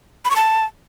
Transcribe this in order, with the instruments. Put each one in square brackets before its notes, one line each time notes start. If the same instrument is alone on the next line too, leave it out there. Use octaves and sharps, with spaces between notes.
[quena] B5
C#6
A5